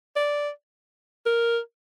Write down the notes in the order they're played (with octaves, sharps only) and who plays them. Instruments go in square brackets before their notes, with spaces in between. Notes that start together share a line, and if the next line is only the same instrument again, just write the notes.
[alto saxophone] D5
A#4